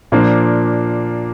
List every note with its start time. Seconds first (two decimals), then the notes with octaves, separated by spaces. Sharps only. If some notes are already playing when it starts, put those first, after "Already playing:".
0.12 A#2 F3 A#3 D4